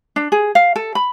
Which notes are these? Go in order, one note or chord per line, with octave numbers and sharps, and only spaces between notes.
D4
G#4
F5
A4
B5